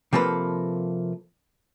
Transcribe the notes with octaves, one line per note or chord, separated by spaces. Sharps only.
C3 F3 A#3 A4 B4